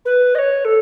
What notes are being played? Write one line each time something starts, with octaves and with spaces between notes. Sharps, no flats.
B4
D#5
C#5
A4